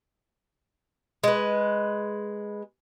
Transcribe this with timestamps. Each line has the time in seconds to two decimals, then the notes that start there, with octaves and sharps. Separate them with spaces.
1.24 G#3 B4